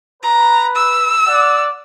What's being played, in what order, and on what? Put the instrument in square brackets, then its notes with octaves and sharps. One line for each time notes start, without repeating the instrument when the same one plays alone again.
[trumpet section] B4 [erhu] A#5
[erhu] E6
[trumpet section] D5 F#5